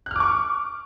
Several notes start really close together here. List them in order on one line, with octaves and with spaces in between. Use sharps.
F#6 F6 D6 C#6